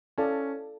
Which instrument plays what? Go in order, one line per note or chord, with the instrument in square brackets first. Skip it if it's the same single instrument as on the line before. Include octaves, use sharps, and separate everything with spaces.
[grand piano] C#4 [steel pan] E4 A4 D5 F5 A5